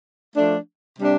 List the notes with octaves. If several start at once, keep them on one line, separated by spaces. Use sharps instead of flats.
F3 A3 D4
C3 G3 D4